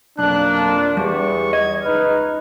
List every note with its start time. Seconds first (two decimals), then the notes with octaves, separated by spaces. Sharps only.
0.19 B1 F2 A#3 D4 F#6
0.57 F4
0.97 E2 G3 C#6
1.53 D#5 G#6
1.84 C#2 D#4 B4 F6